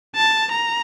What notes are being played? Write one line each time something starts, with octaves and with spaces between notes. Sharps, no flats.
A5
A#5